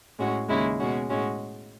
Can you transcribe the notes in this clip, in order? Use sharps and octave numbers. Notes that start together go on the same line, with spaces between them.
A2 G#3 C#4 F#4
D#2 C#3 G#3 C#4 E4
B2 G#3 C#4 F#4
A2 G#3 C#4 F#4